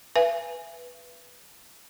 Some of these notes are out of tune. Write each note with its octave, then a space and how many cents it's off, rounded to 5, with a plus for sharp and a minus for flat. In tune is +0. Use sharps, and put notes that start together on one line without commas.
B4 +0 E5 +40 G#5 +0